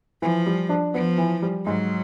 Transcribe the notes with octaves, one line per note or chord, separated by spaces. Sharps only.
E3 F3
G3
D4
F3 B3
E3
G3
G#2 F#3